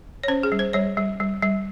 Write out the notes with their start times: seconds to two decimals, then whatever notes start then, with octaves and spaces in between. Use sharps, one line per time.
0.24 C#5
0.28 C#4 C5
0.43 G#4
0.52 G3
0.59 C5
0.73 G3 C#5
0.97 G3
1.20 G3
1.42 G3